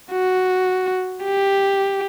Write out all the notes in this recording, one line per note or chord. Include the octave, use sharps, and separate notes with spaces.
F#4
G4